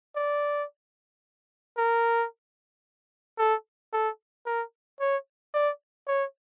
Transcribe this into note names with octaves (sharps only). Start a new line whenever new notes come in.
D5
A#4
A4
A4
A#4
C#5
D5
C#5